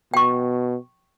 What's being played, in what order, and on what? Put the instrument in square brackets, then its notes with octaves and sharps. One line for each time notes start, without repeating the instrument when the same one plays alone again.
[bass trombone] B2 [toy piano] G5 C#6